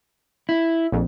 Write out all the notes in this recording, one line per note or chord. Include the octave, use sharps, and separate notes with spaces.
E4
A#1 F2